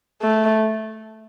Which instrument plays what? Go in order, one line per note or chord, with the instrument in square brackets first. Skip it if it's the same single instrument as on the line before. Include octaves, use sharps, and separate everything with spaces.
[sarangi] A3